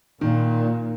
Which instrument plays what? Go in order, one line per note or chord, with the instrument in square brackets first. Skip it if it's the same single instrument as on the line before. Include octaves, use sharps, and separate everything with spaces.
[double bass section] A#2 [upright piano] D#3